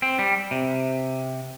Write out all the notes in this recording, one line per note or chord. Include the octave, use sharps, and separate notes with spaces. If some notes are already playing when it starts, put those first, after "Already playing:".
C4
G3
C3